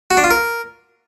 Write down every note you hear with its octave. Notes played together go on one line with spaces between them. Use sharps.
F#4
D4
F4
A#4